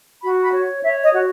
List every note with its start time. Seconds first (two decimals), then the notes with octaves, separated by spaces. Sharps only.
0.22 F#4 B5
0.42 B5
0.52 C#5
0.83 C#5 E5
1.03 D#5
1.13 F#4